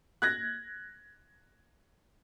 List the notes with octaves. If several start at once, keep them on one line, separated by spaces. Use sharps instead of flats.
F#6 G#6 A#6